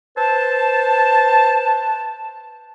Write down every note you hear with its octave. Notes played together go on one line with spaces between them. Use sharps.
B4 C5 A5